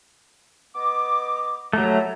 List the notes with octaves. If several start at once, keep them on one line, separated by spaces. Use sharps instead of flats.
B3 D#5 D6
F#3 A3 E4 G4 A#5